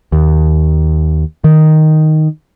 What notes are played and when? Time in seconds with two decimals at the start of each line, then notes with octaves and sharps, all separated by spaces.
0.12 D#2
1.44 D#3